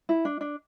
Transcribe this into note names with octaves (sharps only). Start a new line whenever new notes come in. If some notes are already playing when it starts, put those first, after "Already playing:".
E4
D4
D4